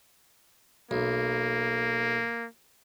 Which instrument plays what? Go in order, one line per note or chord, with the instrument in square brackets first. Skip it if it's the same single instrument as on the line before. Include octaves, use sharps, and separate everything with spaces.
[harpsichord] B1 [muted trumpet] A#3